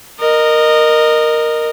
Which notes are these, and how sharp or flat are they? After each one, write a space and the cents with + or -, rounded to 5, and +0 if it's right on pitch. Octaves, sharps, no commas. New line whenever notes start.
A#4 +0 D#5 -20